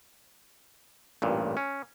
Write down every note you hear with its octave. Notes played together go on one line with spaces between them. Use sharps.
A1 G2 A#2
C#4